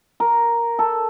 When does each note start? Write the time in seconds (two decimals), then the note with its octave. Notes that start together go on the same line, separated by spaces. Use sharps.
0.20 A#4
0.79 A4